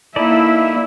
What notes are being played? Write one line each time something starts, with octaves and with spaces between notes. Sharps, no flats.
A#3 D#4 E4 A4 D5 E5